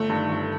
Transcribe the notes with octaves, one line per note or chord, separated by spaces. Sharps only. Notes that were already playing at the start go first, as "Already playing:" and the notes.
Already playing: G1 A3
G2 D#3
G1